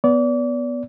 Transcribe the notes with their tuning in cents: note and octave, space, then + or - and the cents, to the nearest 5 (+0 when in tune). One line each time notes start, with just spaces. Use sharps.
B3 +0 D5 -30